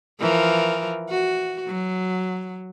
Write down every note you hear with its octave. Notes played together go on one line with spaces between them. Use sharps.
E3 F3 A#4
F#4
F#3